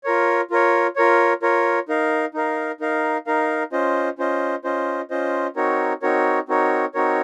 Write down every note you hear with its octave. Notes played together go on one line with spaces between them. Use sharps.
F4 A#4 C#5
F4 A#4 C#5
F4 A#4 C#5
F4 A#4 C#5
D#4 A#4 F5
D#4 A#4 F5
D#4 A#4 F5
D#4 A#4 F5
C#4 F4 C5 D#5
C#4 F4 C5 D#5
C#4 F4 C5 D#5
C#4 F4 C5 D#5
C4 D#4 F#4 A#4 C#5
C4 D#4 F#4 A#4 C#5
C4 D#4 F#4 A#4 C#5
C4 D#4 F#4 A#4 C#5